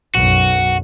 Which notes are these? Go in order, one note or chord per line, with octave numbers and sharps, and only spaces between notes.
B1 F#2 F#4